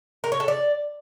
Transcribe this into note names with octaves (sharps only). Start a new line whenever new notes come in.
A#4
C#5
A4
D5